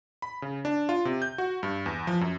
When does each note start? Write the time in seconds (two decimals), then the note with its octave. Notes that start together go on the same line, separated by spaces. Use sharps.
0.22 B5
0.42 C#3
0.65 D4
0.89 F4
1.05 C3
1.22 G6
1.38 F#4
1.63 G2
1.86 E2
2.07 F3
2.21 F#2